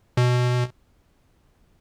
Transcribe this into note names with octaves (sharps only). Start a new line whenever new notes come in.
B2